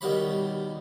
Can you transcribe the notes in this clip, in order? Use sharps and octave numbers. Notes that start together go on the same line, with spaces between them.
D#2 B2 D#3 G3 C#5 B5